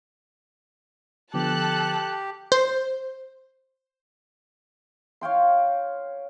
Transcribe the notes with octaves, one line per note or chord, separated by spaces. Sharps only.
D3 F3 B3 G4 A4 A5 F#6
C5
C#5 F5 G5 C6